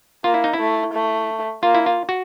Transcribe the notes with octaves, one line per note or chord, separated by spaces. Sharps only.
A#3 F4
E4
D#4
E4
A3
A3
A#3 F4
E4
F4
F#4